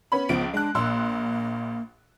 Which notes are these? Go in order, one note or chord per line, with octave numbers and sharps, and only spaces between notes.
B3 C#4 B5
C#2 F3 B3 D7
G#3 D4 F#6
A#1 A#3 C6 E6